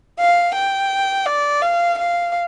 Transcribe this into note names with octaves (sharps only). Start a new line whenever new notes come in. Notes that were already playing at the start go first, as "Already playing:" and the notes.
F5
G5
D5
F5
F5